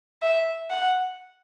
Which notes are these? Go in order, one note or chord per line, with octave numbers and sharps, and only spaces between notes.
E5
F#5